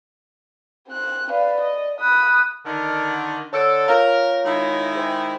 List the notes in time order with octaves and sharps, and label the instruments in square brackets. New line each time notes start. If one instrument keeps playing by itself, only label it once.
[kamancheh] C4 F#6
[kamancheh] B4 F5 [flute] D5
[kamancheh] D#5
[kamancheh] B5 D#6 [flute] F#6
[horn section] D3 D#3
[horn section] D3 A4 [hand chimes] C#5 E6 D7
[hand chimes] F4 C#5 F5 [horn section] A#4
[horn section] D#3 G#3 E4
[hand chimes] G#4 C5 G5